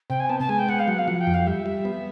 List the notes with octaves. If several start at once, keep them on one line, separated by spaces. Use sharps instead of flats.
C3 G5
G#5
B3 A5
A5
G#3 G#5
G5
B3 F#5
F5
F#3 F#5
F5
F3 F#5
G5
F2
F5
G3 E5
G3
B3